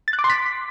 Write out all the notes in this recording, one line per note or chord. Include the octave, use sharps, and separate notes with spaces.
A6
F#6
D6
C6
B6